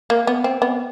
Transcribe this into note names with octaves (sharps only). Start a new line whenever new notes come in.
A#3
B3
C4
B3